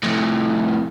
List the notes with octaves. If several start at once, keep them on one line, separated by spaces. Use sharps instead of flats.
F2 A2